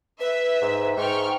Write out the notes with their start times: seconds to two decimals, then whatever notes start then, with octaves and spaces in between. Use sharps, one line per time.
0.20 B4 E5
0.61 G#2
0.97 G#2 G5 C#6 F6